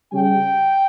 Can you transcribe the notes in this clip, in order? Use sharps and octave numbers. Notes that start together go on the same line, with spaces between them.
C#3 G3 C#4 G5